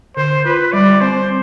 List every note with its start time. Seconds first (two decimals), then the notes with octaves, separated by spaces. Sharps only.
0.16 D3 C5
0.45 F4 B4
0.73 G3 D5
1.01 C4 C5